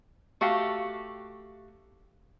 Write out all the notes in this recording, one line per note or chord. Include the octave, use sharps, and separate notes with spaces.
A3 F#4 G4 F5